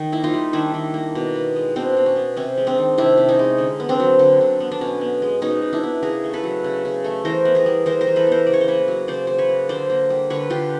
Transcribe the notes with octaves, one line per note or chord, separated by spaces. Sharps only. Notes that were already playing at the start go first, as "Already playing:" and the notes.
Already playing: D#3
A#3 E4
D#4 F4
G3
D#3 D4 E4
D#3
A#3
B2
B3
G#3
B2 C4 D4
B2
C#4
B3
C3 C#4
G#3
C4 D4
D#3
C3 D4 E4
C3
C#4 D#4
G#3
D3
B3
C4 D4
F#3
D3
D3
B3
D4
B2 C#4
B3
G#3
B2 C#4 D#4
B2
D4 E4
B3
C#3 G#4 A#4
A3
A4 B4
F#3
C#3
C#3
A3
E3 A#4 C5
B3
G#4 A#4
G3
E3 A#4 C5
A#4 C5
E3
A4 B4
B3 A#4 C5
C#3 D5
C#5
C5
A#3 B4 C#5
F#3
C#3 C5 D5
C#3 C5
B4 C#5
A#3
D3 C5 D5
A#3
G3
D3 B4 C#5
D3 F4 G4